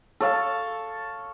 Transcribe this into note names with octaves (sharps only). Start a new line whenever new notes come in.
A4 C#5 F5 A5